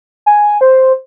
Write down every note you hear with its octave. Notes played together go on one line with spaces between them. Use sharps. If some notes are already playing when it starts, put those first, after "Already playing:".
G#5
C5